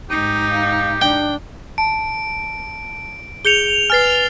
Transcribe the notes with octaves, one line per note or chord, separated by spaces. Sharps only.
G#2 D#4 G4
F5
D4 G5
A5 D7
G#4 G6 C#7 F7 G7
B4 G#5 F6 A6 C7